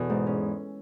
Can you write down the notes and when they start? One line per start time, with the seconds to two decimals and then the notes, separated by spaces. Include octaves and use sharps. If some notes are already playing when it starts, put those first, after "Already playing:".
Already playing: E2 B2 A4
0.10 G#2
0.26 C#4